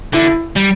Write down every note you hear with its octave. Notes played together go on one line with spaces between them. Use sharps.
D3 E4
G3